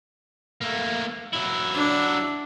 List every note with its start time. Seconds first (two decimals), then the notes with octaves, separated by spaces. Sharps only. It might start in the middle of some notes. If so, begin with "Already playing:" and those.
0.61 A3 A#3
1.33 F#3 E4
1.74 D4